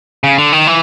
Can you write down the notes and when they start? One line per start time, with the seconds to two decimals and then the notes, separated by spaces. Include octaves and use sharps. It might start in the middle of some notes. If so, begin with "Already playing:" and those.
0.24 C#3
0.38 D3
0.53 D#3
0.67 E3